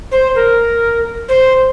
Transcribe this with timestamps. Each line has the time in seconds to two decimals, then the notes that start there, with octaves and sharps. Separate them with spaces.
0.11 C5
0.35 A#4
1.28 C5